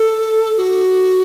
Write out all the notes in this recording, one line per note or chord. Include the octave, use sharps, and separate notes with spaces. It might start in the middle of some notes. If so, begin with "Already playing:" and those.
Already playing: A4
F#4